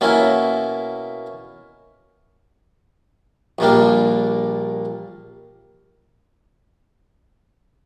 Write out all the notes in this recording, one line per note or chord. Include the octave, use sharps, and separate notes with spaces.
B2 A#3 C#4 E4
A#1 A#2 G3 A#3 D4